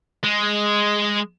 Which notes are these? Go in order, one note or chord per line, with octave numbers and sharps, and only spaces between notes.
G#3